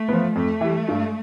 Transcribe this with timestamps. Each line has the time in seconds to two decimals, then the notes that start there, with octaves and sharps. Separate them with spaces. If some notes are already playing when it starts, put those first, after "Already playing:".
Already playing: A3
0.09 F3 B3
0.36 F2 A3
0.61 E3 G3
0.88 G2